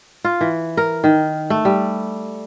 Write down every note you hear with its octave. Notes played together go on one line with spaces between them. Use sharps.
F4
E3
A#4
D#3
A3
G3